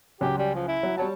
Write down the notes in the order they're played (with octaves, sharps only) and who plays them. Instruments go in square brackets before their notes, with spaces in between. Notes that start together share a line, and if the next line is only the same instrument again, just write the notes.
[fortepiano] C#2 F#3 [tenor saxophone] G4
[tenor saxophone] G3
F3
E4
[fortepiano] F#3
[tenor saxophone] F#3 [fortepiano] G3 C#5 A5